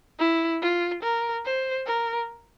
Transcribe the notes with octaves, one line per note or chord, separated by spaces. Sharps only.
E4
F4
A#4
C5
A#4